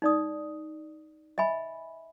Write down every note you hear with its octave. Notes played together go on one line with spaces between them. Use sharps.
D#4 D5 D#6
D#5 E5 G#5 B5